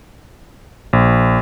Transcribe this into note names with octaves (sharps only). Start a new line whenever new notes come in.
A#1